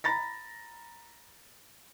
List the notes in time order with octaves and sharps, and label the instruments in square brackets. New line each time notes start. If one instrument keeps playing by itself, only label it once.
[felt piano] A#5 B5 A6 A#6